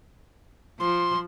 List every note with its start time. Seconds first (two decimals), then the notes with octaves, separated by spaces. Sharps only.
0.79 F3 C6